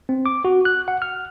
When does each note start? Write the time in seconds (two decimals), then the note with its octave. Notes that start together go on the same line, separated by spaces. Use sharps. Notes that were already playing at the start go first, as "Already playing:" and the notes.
0.09 C4
0.26 D6
0.45 F#4
0.65 F#6
0.88 F#5
1.02 F6